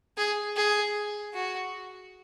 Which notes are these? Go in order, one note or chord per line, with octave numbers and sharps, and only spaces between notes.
G#4
G#4
F#4